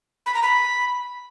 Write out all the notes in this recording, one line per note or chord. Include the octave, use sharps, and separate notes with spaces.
B5
A#5
B5